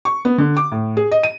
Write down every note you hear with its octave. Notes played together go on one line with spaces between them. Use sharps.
C#6
B3
D3
D6
A2
G#4
D#5
D#7